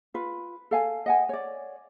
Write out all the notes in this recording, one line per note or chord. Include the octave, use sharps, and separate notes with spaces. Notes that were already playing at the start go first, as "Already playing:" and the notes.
F4 B4
A4 F5 G#5
D#5 F#5 G#5
C#5 D5